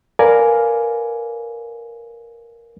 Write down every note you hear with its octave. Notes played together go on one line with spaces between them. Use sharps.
A#4 B4 D5 F5 G#5